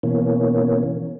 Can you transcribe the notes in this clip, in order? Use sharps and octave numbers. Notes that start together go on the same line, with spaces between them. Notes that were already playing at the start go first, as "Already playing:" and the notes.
B2 E3 A#3 C#4